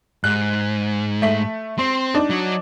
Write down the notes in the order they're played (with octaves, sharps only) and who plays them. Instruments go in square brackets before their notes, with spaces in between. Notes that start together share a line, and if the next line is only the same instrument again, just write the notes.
[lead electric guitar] G#2 [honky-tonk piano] F#6
[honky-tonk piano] A3 B6 F#7
[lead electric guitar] C4 [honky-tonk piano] C6
[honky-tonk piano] D4 D#4
[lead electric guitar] F#3 F#4